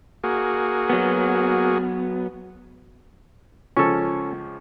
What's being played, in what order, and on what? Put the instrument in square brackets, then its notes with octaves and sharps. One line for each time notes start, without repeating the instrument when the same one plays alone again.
[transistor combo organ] A#3 F#4 G#4
[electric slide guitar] F#3 B3
[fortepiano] C#2 F3 C#6 [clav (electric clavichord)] C#4 A4